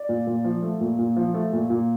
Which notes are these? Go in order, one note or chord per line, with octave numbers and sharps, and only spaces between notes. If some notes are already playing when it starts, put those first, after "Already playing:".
Already playing: D5
A#2
A#2
F3
A3
A#2
A#2
F3
A3
A#2
A#2